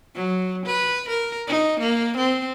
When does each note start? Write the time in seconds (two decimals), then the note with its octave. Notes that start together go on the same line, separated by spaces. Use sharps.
0.15 F#3
0.65 B4
1.08 A#4
1.48 D#4
1.80 A#3
2.17 C4